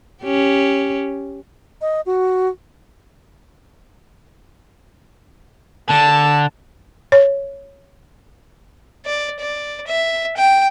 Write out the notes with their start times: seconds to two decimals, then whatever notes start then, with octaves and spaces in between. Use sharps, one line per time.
0.23 C#4 G4
1.81 D#5
2.06 F#4
5.90 D3 A5
7.12 C#5
9.06 D5
9.40 D5
9.87 E5
10.37 G5